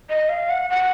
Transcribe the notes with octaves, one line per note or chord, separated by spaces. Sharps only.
D#5
F5
F#5
F#5